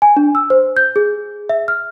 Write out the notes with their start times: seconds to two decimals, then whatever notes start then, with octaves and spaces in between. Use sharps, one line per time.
0.02 G#5
0.17 D4
0.35 E6
0.50 C5
0.77 G6
0.96 G#4
1.49 E5
1.68 F6